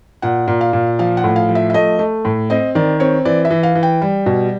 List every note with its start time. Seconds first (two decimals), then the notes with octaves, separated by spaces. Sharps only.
0.22 A#2 F#5
0.48 A#2
0.61 F5
0.73 A#2
0.99 F3 F5
1.17 F#5
1.24 A2
1.36 F5
1.49 F3
1.55 E5
1.70 E5
1.74 A3 D#5
1.99 A3
2.25 A2
2.50 C4 D#5
2.75 D#3 D5
3.00 C4 C#5
3.25 E3 D5
3.45 E5
3.50 E3
3.63 F5
3.75 E3
3.83 G5
4.02 G3
4.26 B2